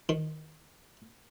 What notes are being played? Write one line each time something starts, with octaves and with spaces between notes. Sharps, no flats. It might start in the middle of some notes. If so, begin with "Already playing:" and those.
D#3